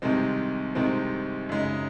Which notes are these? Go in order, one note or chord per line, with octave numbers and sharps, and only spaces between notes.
C2 C3 D#3 G#3 C4
C2 C3 D#3 G#3 C4
F#2 C#3 G#3 D#4